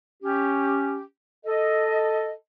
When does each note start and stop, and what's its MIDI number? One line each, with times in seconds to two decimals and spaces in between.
0.23 1.02 61
0.23 1.02 67
1.46 2.32 69
1.46 2.32 75